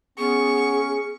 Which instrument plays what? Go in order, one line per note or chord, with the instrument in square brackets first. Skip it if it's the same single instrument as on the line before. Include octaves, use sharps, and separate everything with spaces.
[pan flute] B3 [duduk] C#4 [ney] G#4 [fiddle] C#6